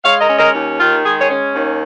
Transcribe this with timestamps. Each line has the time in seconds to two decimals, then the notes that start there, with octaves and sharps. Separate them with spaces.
0.04 G#3 C#5 F5
0.21 A#4 D#5
0.29 C#4
0.37 A#4 D#5
0.53 D#2
0.79 D#3 F4
1.04 G#3 G#4
1.20 G#4 C#5
1.29 C#4
1.54 D#2